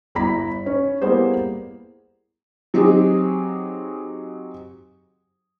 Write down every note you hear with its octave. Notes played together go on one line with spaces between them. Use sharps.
G1 E4 A#5 B5 B6
C#4
G3 A#3 B3 E4 G#4 C5
F#3 C4 D#4 G4 G#4